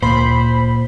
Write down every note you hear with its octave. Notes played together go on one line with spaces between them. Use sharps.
D2 A#2 C5 B5